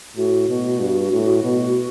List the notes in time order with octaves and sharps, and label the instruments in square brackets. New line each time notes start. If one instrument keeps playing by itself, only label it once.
[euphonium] A2 [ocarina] F#4
[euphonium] B2
G2
A2
B2